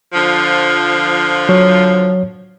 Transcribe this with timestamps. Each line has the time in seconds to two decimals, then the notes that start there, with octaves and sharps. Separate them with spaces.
0.13 D3 F3
1.49 F#3 C#5